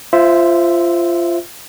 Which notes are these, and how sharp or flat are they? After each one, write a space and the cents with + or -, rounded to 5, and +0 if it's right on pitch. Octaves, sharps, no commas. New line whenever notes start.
F4 -20 C5 +0 E5 +0